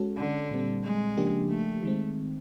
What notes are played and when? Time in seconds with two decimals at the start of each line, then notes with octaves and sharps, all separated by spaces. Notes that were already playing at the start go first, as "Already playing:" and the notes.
Already playing: G#3 C#4 F#4 A4
0.18 D3
0.51 A#2 G3 C4
0.84 G#3
1.17 C#3 F3 A#3 D4 G4
1.50 A3
1.83 D#3 G#3 C4